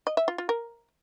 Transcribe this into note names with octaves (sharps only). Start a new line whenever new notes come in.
D#5
E5
F4
F4
A#4